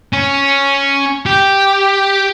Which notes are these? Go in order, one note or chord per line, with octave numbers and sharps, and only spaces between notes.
C#4
G4